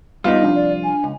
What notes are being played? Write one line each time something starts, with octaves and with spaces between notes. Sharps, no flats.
G3 B3 D#4 F4
C2 F2 D4
D5
G#5
C#2